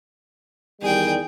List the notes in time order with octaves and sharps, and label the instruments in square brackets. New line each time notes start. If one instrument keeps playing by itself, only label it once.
[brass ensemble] E2 D#3 G3 [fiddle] G#4 G5